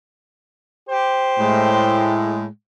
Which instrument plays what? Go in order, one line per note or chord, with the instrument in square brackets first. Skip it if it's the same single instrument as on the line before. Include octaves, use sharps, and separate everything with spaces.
[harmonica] G4 C5
[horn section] A2 G#3